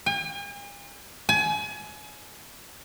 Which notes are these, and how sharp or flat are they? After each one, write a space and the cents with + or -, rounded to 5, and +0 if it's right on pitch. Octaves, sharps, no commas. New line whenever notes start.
G#5 -45
G#5 +30